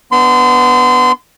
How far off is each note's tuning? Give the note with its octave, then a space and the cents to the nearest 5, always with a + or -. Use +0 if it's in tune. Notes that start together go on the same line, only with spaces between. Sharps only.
B3 +0 D4 +0 C6 -30